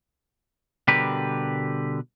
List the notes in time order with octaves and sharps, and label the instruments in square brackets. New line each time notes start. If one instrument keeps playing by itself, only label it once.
[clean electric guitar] B2 D3 G3 G4 A#4 B4